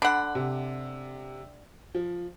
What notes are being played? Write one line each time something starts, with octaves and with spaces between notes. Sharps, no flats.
D3 F#5 B5
C3
F3